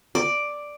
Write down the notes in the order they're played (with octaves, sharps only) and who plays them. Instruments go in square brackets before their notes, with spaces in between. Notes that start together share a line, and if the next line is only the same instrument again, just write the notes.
[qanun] D5